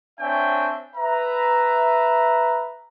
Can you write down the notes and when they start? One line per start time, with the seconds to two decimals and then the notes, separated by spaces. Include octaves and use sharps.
0.19 C4 D4 C#5 E5 G5 G#5
0.95 B4 E5 A#5